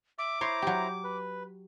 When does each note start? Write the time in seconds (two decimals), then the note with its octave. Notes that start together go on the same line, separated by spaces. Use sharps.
0.18 E5 D6
0.41 E4 C5 C#5 A#5 C6
0.62 F#3 G4
1.04 B4